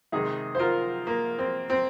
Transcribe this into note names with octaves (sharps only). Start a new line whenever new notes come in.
C3 D#3 G#3 D#4 G#4
C5
F4 A#4
A#3
C4
C4